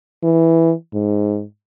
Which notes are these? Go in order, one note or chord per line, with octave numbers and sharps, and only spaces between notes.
E3
G#2